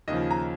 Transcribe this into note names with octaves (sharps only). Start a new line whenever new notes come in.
D#2 C#3 F3 D#5
A#5